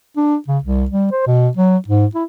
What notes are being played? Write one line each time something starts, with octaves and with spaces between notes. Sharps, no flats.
D4
C#3
C2
G3
C5
B2
F#3
G#2
E4